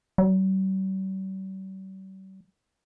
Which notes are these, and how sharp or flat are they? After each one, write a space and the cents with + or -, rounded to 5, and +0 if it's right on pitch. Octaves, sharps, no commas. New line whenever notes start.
G3 -45